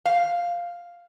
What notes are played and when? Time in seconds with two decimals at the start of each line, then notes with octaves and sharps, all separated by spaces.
0.05 F5